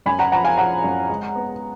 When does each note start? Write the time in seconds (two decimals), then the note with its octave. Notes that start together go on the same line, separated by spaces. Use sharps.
0.06 F#2 G#5 B5
0.19 F#5 A#5
0.32 F3 F#5 A#5
0.44 F5 G#5
0.57 F3 F#5 A#5
0.84 F#2
1.09 G#3
1.36 B3